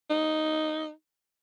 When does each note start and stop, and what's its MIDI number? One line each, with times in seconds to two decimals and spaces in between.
0.10 0.91 63